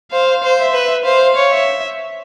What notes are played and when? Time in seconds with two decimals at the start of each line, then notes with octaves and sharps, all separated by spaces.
0.12 C5 F5
0.44 C5
0.59 E5
0.74 B4
1.05 C5 F5
1.36 C#5
1.51 E5